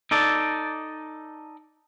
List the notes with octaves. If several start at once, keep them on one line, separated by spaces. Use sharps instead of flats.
D#4 A4 D5